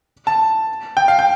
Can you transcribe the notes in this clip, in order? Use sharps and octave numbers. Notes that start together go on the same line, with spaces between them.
A5
G5
F5
G5